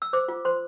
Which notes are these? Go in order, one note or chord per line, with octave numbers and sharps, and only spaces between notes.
E6
C5 D6
F4
C5 C6